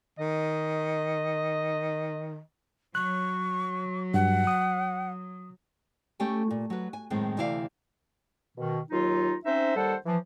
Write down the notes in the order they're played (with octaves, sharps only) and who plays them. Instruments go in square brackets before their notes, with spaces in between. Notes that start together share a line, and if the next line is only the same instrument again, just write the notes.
[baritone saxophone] D#3 [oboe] D#5
[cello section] F#3 [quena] C#6 [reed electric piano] F#6
[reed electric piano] G2 [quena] F#5
[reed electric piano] D#6
[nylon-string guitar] A3 C#4 G4 G5 G#5
A#2
F#3 B4
G#5
F#2 A2 D#3 G#3 C4
D2 C3 E3 E4 D5 F5
[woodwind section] B2 D#3
D#2 F#3 D#4 F4
C4 C#4 D#4 C5 E5
D#2 G3 A4 C5 F#5 A5
E3 F3